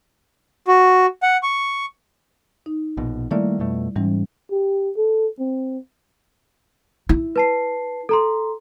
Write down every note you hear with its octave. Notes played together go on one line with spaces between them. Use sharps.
F#4
F#5
C#6
D#4
A#1 B2
D#3 G3 A3 A#3 E4 D5
F2 B2 A3
G#2 E3 G3 C#4
G4
A4
C4
E4
B4 A5 C7
A4 A#5 C6